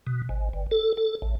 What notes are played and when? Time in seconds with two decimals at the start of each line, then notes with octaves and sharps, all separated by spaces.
0.07 B2
0.29 G#1
0.53 G1
0.71 A4
0.97 A4
1.22 A1